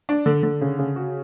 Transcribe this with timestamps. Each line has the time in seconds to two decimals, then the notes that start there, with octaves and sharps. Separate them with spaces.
0.09 D4
0.26 D3
0.43 D3
0.61 C#3
0.79 C#3
0.96 F#4